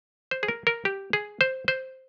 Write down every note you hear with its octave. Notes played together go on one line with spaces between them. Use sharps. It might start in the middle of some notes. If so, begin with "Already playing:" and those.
C5
G#4
A#4
A#4
G4
G#4
C5
C5